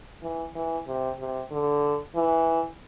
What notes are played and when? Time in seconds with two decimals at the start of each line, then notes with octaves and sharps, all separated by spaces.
0.22 E3
0.55 E3
0.87 C3
1.20 C3
1.51 D3
2.16 E3